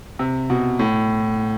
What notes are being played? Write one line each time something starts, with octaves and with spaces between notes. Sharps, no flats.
C3
B2
A2